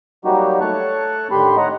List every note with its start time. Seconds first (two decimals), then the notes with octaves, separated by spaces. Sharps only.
0.25 F#3 G3 A#3 D#4 F#4 G4
0.61 A3 C#5 A5 C#6 F#6
1.31 A2 D3 D#3 G4 B5 C6
1.57 C#5 D#5 F#5 A#5